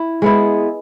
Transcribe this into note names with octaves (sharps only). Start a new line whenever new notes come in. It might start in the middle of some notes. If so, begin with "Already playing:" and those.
Already playing: E4
G#3 B3 E4